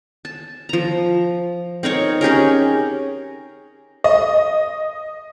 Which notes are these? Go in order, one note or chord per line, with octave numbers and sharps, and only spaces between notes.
A5
F3 A#5
C4 D#4 A#4 C#5
C#4 G4 G#4 A#4
D#5